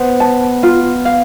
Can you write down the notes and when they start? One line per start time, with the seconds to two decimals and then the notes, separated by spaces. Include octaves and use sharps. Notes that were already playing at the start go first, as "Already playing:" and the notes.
Already playing: B3 C5
0.20 A5
0.63 F4
1.05 F5